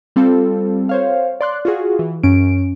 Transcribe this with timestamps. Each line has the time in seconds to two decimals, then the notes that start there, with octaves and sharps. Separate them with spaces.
0.16 G3 C4 F4 A4
0.89 C5 C#5 F5
1.41 D5 C6 F#6
1.65 F4 F#4 G#4
1.99 E3
2.23 F#2 C#4 D7